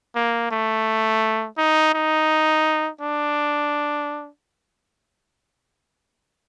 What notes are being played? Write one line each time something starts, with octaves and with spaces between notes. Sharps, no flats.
A#3
A3
D#4
D#4
D4